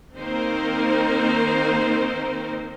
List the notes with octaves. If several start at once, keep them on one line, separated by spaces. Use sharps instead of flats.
D#3 A#3 C4 D#4 A#4 C5